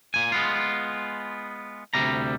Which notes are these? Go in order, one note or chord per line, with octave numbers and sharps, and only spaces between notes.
A#2 G#5
G#3 B3 F4
D2 C3 G3 A#5